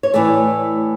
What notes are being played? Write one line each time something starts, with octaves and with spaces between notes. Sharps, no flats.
C#5
A2 E3 A3 D5